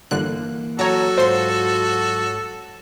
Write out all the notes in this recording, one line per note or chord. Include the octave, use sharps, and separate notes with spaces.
G1 D3 E3 A#3 F#6
F#3 F#4 A4 C#5 A#5
G#2 F4 C5 C6